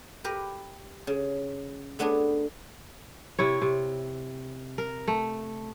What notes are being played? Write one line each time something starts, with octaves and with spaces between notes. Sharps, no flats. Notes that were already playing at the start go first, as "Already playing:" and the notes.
G4 A#4 B4
C#3
A3 B3 D4 F#4 G#4
C3 E4 C#5
C3
A#4
A3